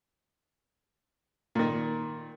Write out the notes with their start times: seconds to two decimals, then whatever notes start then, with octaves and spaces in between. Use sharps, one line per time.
1.55 A#2 D#3